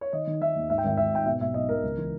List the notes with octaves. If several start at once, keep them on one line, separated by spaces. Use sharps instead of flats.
C#5
D#3 D#5
D#3
D#3 E5
D#2
G#2 E5
G5
G#1 E5
G#1 E5
G#2 G5
B2 E5
B1 E5
B1 D#5
B1 A#4
C#2
E3